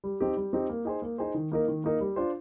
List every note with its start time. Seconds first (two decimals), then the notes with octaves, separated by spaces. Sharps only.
0.04 G3
0.20 C4 D#4 G4
0.37 G3
0.53 C4 D#4 G4
0.69 A#3
0.85 D#4 G#4 C5
1.02 A#3
1.18 D#4 G#4 C5
1.34 D#3
1.52 A#3 D#4 A#4
1.68 D#3
1.84 A#3 D#4 A#4
2.01 G3
2.16 D4 F4 C5